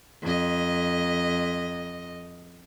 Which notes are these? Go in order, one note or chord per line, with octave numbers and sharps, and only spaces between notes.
F2 D#5